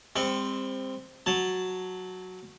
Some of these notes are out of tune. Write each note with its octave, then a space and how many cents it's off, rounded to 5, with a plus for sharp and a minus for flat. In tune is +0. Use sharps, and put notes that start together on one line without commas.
G3 +45 C4 +0
F#3 +0 A5 +0